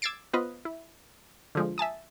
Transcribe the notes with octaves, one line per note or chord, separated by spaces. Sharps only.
D6 E6 G#6 A6 C7 D7
B3 F4 B4 C5 D#5
E4
D3 F3 G#3
E5 G#5 A5 D#6